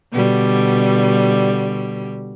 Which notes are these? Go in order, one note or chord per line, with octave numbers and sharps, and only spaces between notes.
B2 D3 G3